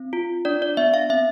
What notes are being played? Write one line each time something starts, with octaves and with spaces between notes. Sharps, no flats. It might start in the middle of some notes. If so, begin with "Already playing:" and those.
Already playing: C4
F4
D4 D5
D5
B3 E5
F5
C4 E5